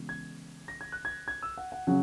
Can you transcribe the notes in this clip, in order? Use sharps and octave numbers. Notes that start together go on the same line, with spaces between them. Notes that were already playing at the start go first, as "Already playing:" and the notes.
Already playing: C#3 E3 G#3 B3
G#6
A#6
G#6
F#6
G#6
G#6
E6
F#5
F#5
C#3 F#3 C#4 F#5